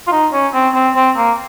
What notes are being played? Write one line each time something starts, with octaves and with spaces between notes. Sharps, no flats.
F4
D#4
C#4
C4
C4
C4
A#3